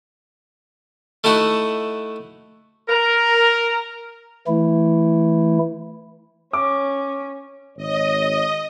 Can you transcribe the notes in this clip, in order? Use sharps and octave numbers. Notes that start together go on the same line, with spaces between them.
A3 D#4 E4 F#4 F#5
A#4
E3 A3 E4
C#4 D6
G#1 C#5 D#5